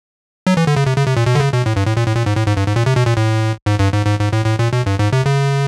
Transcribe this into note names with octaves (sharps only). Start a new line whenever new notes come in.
F#3
E3
D3
C#3
C3
C#3
C3
A#2
B2
D3
C#3
B2
A2
G2
A2
A#2
A2
A#2
G#2
A2
G#2
G2
G#2
A#2
C3
B2
A#2
A2
G#2
G2
G#2
G#2
G#2
A2
A2
A#2
B2
G2
G#2
C3
C#3